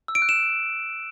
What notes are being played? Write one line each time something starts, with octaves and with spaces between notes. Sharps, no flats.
E6
D7
F#6
E7